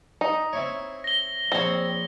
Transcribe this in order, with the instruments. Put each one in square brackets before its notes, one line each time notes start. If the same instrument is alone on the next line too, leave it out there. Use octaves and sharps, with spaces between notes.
[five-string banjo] D#4
[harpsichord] C4 E4 C#5
[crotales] A#6 G7
[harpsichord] A#1 C#5 [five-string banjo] C4